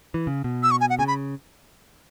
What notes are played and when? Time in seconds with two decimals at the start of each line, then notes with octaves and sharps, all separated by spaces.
0.14 E3
0.27 C#3
0.44 B2
0.63 E6
0.71 C#6
0.81 G#5
0.90 F#5
0.99 C#3 G#5
1.08 B5